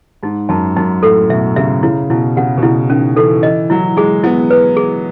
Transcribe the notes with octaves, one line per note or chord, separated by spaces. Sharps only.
G#2 D#4
F#2 A5
F#2 D#4
A2 A4
B2 E5
C#3 E5
C#3 E4
B2 E4
C#3 F#5
B2
C#3 E4
D#3 C#4
E3 A4
E3 D#5
F#3 E4
G#3 G#4
B3 E4
B4
G#4